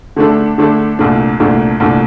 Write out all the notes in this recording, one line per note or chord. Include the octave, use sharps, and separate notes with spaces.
D3 A3 D4 A4
D3 A3 D4 A4
C2 A#2 A3 D4
C2 A#2 A3 D4
C2 A#2 A3 D4